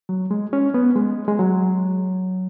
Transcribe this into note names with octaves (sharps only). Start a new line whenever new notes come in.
F#3
G#3
C#4
B3
G#3
G#3
F#3